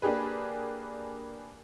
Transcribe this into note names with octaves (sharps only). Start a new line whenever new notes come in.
A#3 D4 G4 G#4 B4